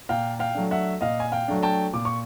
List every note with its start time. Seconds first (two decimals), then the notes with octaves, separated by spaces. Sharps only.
0.09 A#2 F5 G5
0.39 F5 G5
0.55 F#3 A3 D4
0.71 E5 F#5
1.01 A#2 D#5 F5
1.20 G#5
1.32 F5 G5
1.48 F#3 A3 D4
1.63 G5 A5
1.93 A#2 D6
2.05 C#6